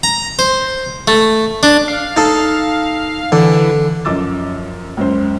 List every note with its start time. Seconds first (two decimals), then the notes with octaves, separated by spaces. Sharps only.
0.03 A#5
0.39 C5
1.08 A3
1.63 D4
1.88 F5
2.17 D#4 A4
3.32 D3 E3
4.05 F#2 F3 D#5 D6 E6 A6
4.97 C#2 F#2 C5